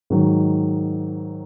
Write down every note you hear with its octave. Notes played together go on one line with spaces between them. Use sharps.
G#2 D#3 F#3